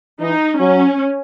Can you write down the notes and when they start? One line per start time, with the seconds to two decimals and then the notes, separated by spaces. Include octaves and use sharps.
0.20 E3 D#4
0.60 F#3 C#4